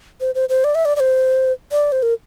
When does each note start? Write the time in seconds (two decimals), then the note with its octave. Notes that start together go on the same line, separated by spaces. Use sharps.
0.21 C5
0.35 C5
0.49 C5
0.64 D5
0.75 E5
0.85 D5
0.96 D5
1.00 C5
1.72 D5
1.92 C5
2.03 A#4